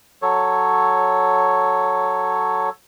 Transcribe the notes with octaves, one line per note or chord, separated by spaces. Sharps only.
F#3 A4 C#5